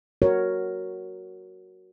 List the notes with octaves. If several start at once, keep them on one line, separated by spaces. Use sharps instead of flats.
F#4 A#4 C#5